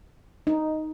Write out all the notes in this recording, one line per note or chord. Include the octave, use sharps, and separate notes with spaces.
D#4